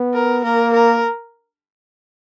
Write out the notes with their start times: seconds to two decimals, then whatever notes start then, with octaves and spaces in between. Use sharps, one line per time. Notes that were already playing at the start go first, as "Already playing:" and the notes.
Already playing: B3
0.14 A#4
0.43 A#3 A#4
0.74 A#4